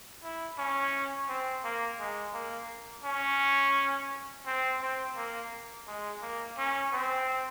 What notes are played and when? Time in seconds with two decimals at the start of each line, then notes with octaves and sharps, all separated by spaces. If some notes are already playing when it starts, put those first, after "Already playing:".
0.23 E4
0.58 C#4
1.29 C4
1.64 A#3
2.00 G#3
2.34 A#3
3.05 C#4
4.46 C4
4.81 C4
5.16 A#3
5.87 G#3
6.22 A#3
6.58 C#4
6.93 C4